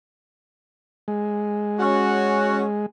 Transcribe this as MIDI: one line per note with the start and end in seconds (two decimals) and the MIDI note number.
1.08 2.86 56
1.79 2.62 61
1.79 2.62 66